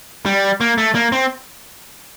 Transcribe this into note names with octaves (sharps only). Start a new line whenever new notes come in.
G3
A#3
A3
A#3
C4